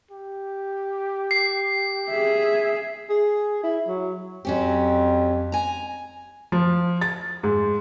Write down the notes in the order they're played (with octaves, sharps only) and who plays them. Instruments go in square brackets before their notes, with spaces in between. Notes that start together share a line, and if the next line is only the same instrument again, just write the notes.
[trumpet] G4
[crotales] C7
[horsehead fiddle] G#4 E5
[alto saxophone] G#4
E4
F#3
[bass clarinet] F2 [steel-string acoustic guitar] F#3 C#4 G4
[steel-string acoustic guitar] G#5 A#5
[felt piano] F3
A6
G#2